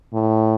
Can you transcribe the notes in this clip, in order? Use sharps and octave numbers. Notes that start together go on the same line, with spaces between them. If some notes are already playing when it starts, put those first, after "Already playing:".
A2